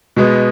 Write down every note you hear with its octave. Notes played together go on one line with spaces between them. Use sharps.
B2 G#3 B3